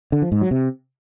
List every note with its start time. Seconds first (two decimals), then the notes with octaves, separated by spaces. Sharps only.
0.12 D3
0.22 F3
0.32 G#2
0.41 F#3
0.51 C3